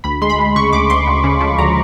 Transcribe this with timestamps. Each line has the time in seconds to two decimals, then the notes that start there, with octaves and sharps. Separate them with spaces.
0.04 D2 B5
0.22 G#3 C6
0.30 B5
0.39 G#3
0.56 C#3 C#6
0.73 D2 D6
0.90 D2 C6
1.07 D2
1.24 C#3
1.41 F3
1.58 D2 A#5